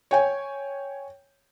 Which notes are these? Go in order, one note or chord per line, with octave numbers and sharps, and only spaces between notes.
C#5 G5 G#5